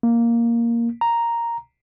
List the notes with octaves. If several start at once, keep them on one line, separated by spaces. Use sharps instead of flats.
A#3
A#5